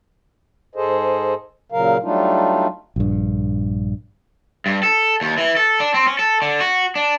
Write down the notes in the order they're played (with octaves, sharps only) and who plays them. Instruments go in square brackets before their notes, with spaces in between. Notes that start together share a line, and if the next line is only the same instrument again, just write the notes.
[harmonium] G#2 G#4 A4 C5 D#5
A#2 C#3 F#3 A#4 F5
F#3 G3 A3 D4 D#4 F4
[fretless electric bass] A#1 G2
[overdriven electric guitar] G2
A4
D#2
E3
A4
D4
C4
C#4
A4
D3
F#4
D4